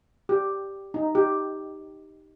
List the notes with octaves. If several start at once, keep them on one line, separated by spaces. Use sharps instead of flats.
G4
D#4
G4